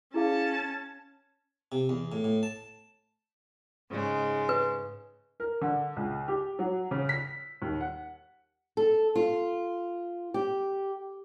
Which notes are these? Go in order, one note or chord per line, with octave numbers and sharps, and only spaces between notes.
C#4 E4 G#4 F5 A5
G#6
C3
E2
A2
A2
A5
G#2 C#3 G#3
B4
A#4
D3
C#2
G4
F#3
C#3
B6
D#2
F#5
A4
F4
G4